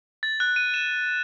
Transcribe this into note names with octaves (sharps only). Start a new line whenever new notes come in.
A6
F#6
D#7
E7